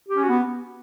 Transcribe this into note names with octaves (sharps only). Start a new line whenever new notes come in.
G4
C#4
F#4
B3